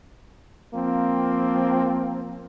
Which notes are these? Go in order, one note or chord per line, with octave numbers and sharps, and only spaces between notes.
F3 A#3 C4